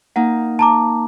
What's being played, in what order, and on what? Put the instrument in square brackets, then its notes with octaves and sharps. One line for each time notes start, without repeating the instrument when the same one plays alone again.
[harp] A#3 D#4 [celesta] F#5
[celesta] A5 A#5 D6